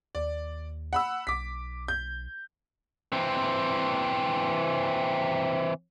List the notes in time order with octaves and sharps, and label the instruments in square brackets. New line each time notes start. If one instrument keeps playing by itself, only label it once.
[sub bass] D#2 [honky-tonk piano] D5
[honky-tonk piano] F#5 B5 E6
[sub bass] B1 [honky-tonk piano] D6 B6
[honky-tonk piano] G6
[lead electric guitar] E3 C4